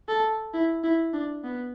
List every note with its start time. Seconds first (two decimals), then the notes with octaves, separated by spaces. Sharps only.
0.08 A4
0.53 E4
0.83 E4
1.13 D4
1.44 B3